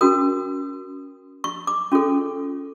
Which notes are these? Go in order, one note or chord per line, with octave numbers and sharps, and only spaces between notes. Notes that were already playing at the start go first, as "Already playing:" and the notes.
C#4 F#4 A#4 D#6
C#6
D6
C#4 F4 A4